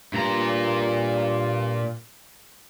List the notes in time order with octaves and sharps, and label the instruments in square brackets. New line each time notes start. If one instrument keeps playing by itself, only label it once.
[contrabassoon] G2 [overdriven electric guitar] A#2 A#5